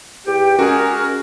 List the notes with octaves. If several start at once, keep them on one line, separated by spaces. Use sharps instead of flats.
E2 G4 G5
G#3 C#4 F#4 G#4 A#4